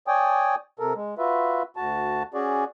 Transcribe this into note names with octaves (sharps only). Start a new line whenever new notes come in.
C#5 D5 G5 G#5 D#6
C3 A4 A#4
G#3
F4 F#4 B4 E5
D2 F#4 A5
C#4 F#4 G#4 D5